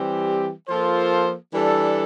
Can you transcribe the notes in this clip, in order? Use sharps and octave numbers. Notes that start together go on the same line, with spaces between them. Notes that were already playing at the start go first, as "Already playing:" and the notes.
Already playing: E3 G3 C4 G4
F3 A#3 F4 A4 C5
E3 G3 D4 A4